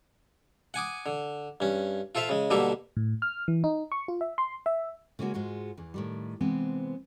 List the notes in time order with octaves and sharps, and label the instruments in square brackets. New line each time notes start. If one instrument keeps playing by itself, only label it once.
[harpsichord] F#5 G#5 D6 D#6
D3
G2 C#4
F4 A4 C5 E5 F5
C#3 G#3
B2 D3 G3 A#3 G4 A4
[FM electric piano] A2
F6
E3
D#4
C#6
F4
E5
C6
E5
[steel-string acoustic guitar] C#3 G#3 A#3 C#4 F#4
G#2 G#3 F4 F#4
E2 E3
A2 D#3 G3
C3 E3 G#3 B3 C4